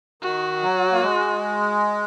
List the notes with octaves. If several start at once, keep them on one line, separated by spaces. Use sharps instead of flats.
D#3 F#4
F#3
A#3
G#3